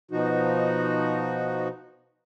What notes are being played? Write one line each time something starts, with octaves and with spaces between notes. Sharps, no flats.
B2 F3 D#4 F#4